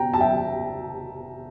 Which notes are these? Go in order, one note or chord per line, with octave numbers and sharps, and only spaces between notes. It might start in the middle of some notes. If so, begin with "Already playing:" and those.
Already playing: G5 A#5
A5
E5 G5